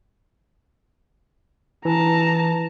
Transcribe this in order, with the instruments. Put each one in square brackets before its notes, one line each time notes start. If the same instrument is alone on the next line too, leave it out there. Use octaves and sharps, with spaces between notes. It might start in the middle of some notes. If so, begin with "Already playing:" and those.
[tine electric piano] E3 [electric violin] A5 A#5